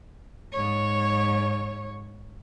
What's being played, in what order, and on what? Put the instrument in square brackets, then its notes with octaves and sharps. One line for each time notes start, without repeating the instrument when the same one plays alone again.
[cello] G#2 C#5